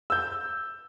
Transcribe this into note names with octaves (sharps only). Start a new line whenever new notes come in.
E6 G6